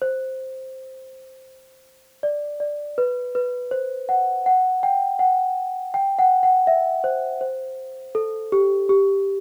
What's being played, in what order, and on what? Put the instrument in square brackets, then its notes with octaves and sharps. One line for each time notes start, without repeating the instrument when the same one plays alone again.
[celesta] C5
D5
D5
B4
B4
C5
F#5
F#5
G5
F#5
G5
F#5
F#5
E5
C5
C5
A4
G4
G4